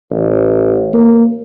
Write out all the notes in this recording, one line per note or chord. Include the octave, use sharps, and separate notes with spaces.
A1
A#3